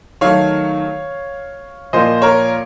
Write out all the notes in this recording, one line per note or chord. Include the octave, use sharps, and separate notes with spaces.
D#3 F#3 A3 C#5 F5
A#2 F3 A#3 C5 D#5
A#4 C#5